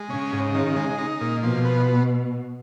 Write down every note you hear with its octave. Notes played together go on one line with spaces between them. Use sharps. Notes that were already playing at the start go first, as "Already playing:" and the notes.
Already playing: G#3
C#3 C#4
G#2
D#3
G#3
D#4
A#2
B2 F3
B3